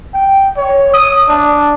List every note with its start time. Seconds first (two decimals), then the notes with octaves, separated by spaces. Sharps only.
0.14 G5
0.57 C#5
0.94 D#6
1.29 D4